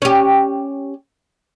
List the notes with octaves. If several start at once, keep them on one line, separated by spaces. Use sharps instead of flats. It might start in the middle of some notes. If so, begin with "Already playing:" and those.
C#4 G4